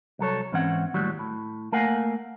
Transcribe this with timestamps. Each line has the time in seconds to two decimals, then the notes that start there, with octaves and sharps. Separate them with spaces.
0.19 C2 F#3 A4 C#5
0.52 G#2 E3 C4 C#4 F#5
0.94 D#2 A2 F#3 G3
1.19 A2
1.72 A3 A#3 A#4 F5 F#5 G#5